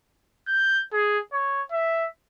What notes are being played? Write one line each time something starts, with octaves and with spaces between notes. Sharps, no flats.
G6
G#4
C#5
E5